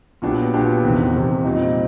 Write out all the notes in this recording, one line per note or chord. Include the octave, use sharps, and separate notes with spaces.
A#2 F#3 B3 D4 G4
A#2 F#3 B3 D4 G4
E2 C3 D#3
E2 C3 D#3
A#2 G3 C4 D#4